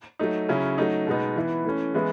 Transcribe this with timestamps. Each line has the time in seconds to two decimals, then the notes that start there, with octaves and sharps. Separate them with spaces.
0.19 F#3 A3 D#4
0.49 C#3 F#3 C#4 E4
0.78 F#3 A3 D#4
1.07 B2 G#3 B3 D#4
1.36 E3 B3 E4
1.65 E3 A3 C#4
1.94 E3 G#3 B3 E4